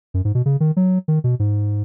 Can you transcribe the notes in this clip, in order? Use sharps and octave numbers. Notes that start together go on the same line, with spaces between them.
F#2
G#2
B2
C#3
D#3
F#3
D#3
B2
G#2